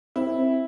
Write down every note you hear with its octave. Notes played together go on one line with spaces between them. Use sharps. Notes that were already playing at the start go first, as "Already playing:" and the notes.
C4 E4